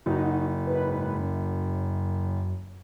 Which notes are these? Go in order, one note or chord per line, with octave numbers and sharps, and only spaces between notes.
F#1 D#4 F#4
G#2 B4
F#2